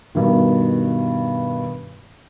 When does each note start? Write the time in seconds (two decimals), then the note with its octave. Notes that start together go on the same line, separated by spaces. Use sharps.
0.15 G2 B2 D#3